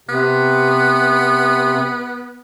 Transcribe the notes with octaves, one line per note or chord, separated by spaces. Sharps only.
C3 B3